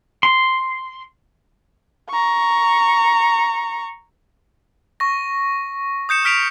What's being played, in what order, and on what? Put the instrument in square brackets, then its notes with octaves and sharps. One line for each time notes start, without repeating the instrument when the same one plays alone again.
[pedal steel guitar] C6
[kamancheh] A#5 C#6
[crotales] C#6 A#6
D#6 G6 C#7 E7
F6 B6 D7 F7